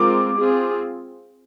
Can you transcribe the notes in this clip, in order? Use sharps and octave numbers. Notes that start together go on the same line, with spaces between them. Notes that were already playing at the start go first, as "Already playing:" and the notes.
Already playing: G#3 C4 F4 A#4 D6
C4 F4 G#4